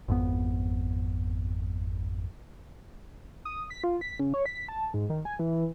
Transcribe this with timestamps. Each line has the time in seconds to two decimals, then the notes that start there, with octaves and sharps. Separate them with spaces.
0.08 G#1 F2 B3
3.45 D#6
3.70 B6
3.84 F4
4.01 B6
4.19 C#3
4.34 C#5
4.46 B6
4.68 A5
4.94 G#2
5.10 D#3
5.25 G#5
5.39 E3